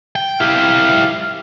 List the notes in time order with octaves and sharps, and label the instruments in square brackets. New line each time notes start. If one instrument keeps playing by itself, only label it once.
[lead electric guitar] G5
[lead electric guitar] E4 G4 [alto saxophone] F5